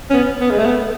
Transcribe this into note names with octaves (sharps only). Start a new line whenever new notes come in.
C#4
B3
B3
G#3
A3
B3